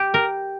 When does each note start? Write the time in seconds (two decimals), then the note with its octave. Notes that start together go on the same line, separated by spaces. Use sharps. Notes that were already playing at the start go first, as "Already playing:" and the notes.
Already playing: G4
0.14 A#4